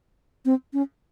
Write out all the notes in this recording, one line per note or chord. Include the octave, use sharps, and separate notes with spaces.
C4
C#4